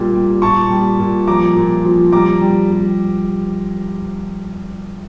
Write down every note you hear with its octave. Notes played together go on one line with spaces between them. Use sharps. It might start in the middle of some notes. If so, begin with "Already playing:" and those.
Already playing: A#2 G3
G3
A#2 A5 C#6
G3
A#2
F3 A#5 D6
A#2
F3
G3 A#5 D6
G3
G3